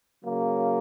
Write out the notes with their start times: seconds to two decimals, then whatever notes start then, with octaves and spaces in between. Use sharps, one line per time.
0.24 C#3 F#3 A#3